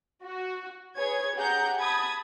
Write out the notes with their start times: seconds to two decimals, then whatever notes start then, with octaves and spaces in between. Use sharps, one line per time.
0.23 F#4
0.96 G#4 B4 C#5 G#6
1.36 G4 G#4 F#5 A#5 G6
1.80 A5 B5 D#6 G#6